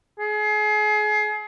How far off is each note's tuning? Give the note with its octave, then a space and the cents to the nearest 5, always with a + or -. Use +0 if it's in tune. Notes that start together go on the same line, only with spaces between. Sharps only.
G#4 +30